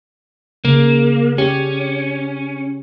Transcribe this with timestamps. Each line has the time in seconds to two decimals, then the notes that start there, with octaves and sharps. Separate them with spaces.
0.65 C#3 A#3
1.38 C#4 G4